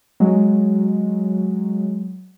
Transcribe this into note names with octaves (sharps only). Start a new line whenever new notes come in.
F#3 G#3